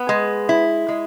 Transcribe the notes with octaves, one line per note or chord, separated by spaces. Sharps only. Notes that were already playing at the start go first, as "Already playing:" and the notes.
Already playing: B3
G#3
E4
G#3